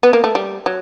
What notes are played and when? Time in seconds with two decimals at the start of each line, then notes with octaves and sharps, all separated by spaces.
0.03 B3
0.13 A#3
0.24 A3
0.35 G3
0.66 F#3